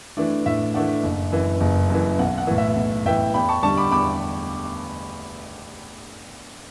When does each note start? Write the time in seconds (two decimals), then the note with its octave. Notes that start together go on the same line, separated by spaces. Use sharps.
0.17 E3 A3 D4
0.46 A2 E5
0.74 E3 A3 D4 F#5
1.03 F#1
1.32 F#2 E3
1.61 F#1
1.90 F#2 E3
2.19 B1 F#5
2.38 F#5
2.47 A2 E3
2.58 E5
2.76 B1
3.05 A2 E3 E5 G5
3.34 E2 G5 B5
3.49 A5 C#6
3.63 D3 G3 A5 C#6
3.77 B5 D6
3.91 E2 B5 D6